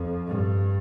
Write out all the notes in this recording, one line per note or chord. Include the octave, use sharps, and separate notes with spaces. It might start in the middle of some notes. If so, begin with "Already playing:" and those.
Already playing: F2
G2